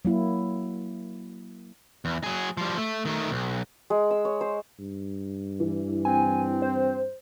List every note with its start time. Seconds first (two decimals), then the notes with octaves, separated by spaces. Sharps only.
0.05 F#3 A#3 E4
2.05 E2
2.24 F#3 G#4
2.57 F3 G3
2.77 A3
3.05 D#3 A3
3.31 B1
3.90 G#3
4.11 E6
4.25 C#5
4.41 C5
4.79 G2
5.60 E3
6.05 C4 G#5
6.62 C5